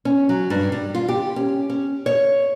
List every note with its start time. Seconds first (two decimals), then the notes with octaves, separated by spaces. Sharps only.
0.05 C#4
0.29 F#3
0.50 G2
0.72 G3
0.95 F4
1.09 G4
1.36 C#4
1.70 C#4
2.06 C#5